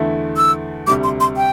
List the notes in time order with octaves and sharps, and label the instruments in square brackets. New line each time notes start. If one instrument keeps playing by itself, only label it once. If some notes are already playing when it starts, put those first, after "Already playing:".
Already playing: [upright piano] E2 D3 A3 E4
[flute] E6
[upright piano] D2 C3 G3 [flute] D6
[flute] C6
C6
G5